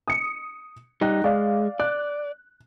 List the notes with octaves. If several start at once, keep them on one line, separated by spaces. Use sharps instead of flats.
D#6 C#7
G3 D#4 G5 F#6
G#3 D5 F5
D5 F#6